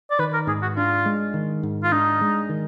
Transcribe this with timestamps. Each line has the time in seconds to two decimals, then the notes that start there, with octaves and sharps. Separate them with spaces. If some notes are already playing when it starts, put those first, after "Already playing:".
0.11 D5
0.19 D#3 B4
0.33 A#4
0.47 G#2 G#4
0.62 F#4
0.77 D4 F4
1.06 G#3
1.34 D#3
1.63 G#2
1.83 F4
1.92 D4 D#4
2.21 G#3
2.49 D#3